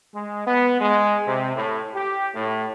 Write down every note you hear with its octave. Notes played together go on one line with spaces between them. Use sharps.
G#3
B3
G#3
C3
A2
G4
A2